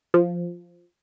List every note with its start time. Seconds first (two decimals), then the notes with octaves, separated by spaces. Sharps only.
0.14 F3